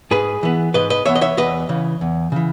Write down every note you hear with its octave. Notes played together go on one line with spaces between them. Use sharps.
G#2 G#4 B4
E3 B3
G#2 B4 D#5
B4 D#5
E3 B3 C#5 E5
D#5
C#5 E5
E2 B4 D#5
C#3 E3
E2
C#3 E3